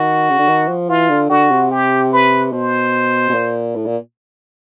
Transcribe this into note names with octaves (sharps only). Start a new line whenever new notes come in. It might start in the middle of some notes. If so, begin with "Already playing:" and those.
Already playing: D#3 F#4
C#3
D3
D#3
F3
E3 F4
D3
D3 F#4
C3
G4
B4
B2 C5
B2
A#2
A2
A#2